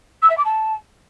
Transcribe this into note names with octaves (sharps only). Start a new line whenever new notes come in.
E6
E5
D6
A5